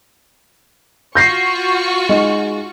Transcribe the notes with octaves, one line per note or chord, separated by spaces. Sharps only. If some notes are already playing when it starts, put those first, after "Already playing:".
F4 F#4 C#6 G6 A#6 C7
G#3 D#4